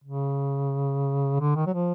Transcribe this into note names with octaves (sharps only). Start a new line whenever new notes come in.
C#3
D3
D#3
F#3
F3